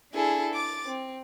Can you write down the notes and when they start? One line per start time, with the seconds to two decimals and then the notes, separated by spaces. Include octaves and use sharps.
0.14 D4 E4 G#4 A4
0.54 D6 A6
0.86 C4